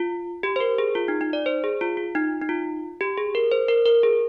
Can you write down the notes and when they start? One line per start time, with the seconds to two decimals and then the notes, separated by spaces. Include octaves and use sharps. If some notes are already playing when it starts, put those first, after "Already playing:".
Already playing: F4
0.43 G4
0.56 C5
0.60 A#4
0.78 G#4
0.95 F4
1.08 D#4
1.21 D#4
1.33 D5
1.46 C5
1.64 G#4
1.81 F4
1.97 F4
2.15 D#4
2.42 D#4
2.49 F4
3.01 G4
3.18 G#4
3.35 A#4
3.52 C5
3.68 A#4
3.86 A#4
4.03 G#4